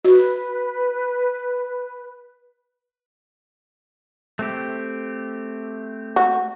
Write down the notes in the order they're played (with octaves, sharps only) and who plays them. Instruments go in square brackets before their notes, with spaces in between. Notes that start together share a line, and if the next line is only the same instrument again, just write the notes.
[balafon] F#4 [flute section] B4
[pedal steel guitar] A3 C4 G4
[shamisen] F#4